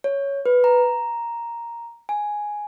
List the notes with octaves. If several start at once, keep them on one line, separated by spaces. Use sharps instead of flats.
C#5
B4
A#5
G#5